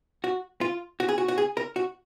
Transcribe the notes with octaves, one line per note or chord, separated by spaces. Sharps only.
F#4
F4
F#4
G#4
F#4
F#4
G#4
A#4
F#4